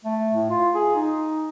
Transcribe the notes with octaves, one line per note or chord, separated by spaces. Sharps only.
A3
A2
F4
G#4
D#4